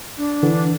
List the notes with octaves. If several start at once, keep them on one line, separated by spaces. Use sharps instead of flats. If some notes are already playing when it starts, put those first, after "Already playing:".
D4
D3 E3